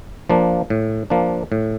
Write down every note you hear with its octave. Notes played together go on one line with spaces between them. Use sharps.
F3 A#3 D4
A2
F3 A#3 D4
A2